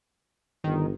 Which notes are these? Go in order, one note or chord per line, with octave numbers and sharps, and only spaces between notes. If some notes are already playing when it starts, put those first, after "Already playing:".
G1 D#3